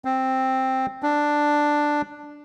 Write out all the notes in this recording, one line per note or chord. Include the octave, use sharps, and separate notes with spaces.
C4
D4